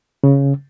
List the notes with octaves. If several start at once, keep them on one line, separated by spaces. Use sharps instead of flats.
C#3